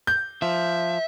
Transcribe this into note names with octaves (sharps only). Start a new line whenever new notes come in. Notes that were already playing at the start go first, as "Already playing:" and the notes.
G6
F3 E5